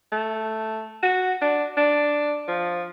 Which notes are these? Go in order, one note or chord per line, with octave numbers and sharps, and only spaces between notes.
A3
F#4
D4
D4
F3